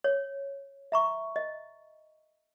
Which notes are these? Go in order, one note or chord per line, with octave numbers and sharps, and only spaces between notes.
C#5
E5 A#5 C#6
D#5